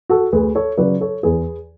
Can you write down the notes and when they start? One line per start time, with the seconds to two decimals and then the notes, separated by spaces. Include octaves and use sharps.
0.10 F#4 A4
0.32 D2 G#4 B4
0.55 A4 C#5
0.78 C#3 F#3 B4 D5
1.01 A4 C#5
1.23 E2 G#4 B4